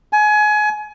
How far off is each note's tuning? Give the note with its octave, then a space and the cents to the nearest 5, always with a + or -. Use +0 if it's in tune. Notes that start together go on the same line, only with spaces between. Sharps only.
G#5 +25